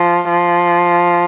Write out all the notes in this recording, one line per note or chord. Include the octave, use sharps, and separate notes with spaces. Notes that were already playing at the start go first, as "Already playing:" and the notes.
Already playing: F3
F3